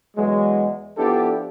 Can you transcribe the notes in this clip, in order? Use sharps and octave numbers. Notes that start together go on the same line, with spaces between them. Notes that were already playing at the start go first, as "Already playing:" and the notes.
E2 E3 F#3 G#3
F3 B3 D4 E4 G4 A4